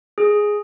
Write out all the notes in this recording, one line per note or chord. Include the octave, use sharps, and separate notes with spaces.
G#4